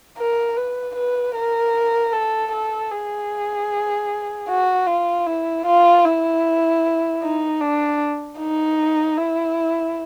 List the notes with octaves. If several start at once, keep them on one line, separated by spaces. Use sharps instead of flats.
A#4
B4
B4
A#4
A4
A4
G#4
F#4
F4
E4
F4
E4
D#4
D4
D#4
E4